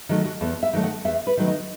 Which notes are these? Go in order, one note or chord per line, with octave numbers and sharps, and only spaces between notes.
D#3 F#3 A3
F#4
E2 A4
E5
D#3 F#3 A3
F#5
E2 E5
B4
D#3 F#3 A3
D#4